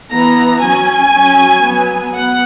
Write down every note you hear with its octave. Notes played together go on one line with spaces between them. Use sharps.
E3 B3 A#5
F#3 C#4 G#5
F#3 C#4
F#3 B3
B3 F#5